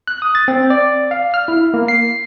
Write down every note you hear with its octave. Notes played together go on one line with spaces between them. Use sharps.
F#6
D#6
A6
C4
D5
F5
F6
E4
A#3
C7